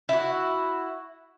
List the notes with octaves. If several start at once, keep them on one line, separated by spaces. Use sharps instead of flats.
E4 F#4